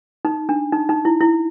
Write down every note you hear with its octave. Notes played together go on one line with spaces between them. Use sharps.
D#4
D4
D#4
D#4
E4
E4